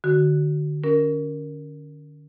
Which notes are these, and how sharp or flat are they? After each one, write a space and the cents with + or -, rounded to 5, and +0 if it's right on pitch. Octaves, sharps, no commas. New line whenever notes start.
D3 +30 F#4 +10
C#4 +30 A#4 +0